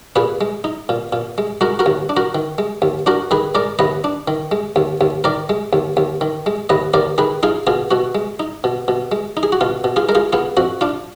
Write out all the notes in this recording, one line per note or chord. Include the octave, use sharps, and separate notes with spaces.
A#2 G#4 B4
G#3
D#4
A#2
A#2
G#3
G#3 F#4 A#4
F#4 A#4
D#2
D4
F#4 A#4
D#3
G#3
D#2
D4 F#4 A#4
D#3 G#4 B4
G#3 A#4 D5
D#2 B4 D#5
D4
D#3
G#3
D#2
D#2
D#3 A#4 D5
G#3
D#2
D#2
D#3
G#3
D#2 B4 D#5
D#2 A#4 D5
D#3 G#4 B4
D#4 F4 G#4
B2 F4 G#4
B2 F#4
G#3
D#4
B2
B2
G#3
D#4
G#4
F#4
B2 F4
B2
F4 G#4
G#3 A#4
F4 G#4
B3 F4 G#4
F2 F#4
D4 F4